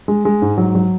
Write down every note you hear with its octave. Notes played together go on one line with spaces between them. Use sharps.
G#3
G#3
G#2
F#3
F#3